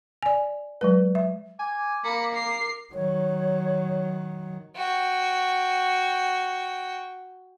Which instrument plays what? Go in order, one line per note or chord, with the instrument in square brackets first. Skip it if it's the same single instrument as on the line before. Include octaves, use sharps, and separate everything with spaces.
[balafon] D5 G#5
F#3 G#3 B4
E5
[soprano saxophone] G#5 [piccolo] D6
[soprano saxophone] A#3 [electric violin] B5 C#7
[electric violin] A#4 C7
[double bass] D#3 F#3 [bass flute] C#5
[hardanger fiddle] F#4 G5